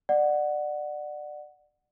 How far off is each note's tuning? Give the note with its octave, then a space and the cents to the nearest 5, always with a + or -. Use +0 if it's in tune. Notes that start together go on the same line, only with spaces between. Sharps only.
D5 +25 F#5 +0